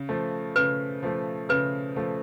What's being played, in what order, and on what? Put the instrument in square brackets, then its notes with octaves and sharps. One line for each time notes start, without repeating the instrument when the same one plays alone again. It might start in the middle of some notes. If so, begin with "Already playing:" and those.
Already playing: [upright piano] C#3
F3 A3
[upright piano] C#3 [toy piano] B4
[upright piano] F3 A3
[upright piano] C#3 [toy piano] B4
[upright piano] F3 A3